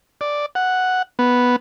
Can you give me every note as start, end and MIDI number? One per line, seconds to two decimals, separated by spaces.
0.21 0.46 74
0.55 1.02 78
1.19 1.56 59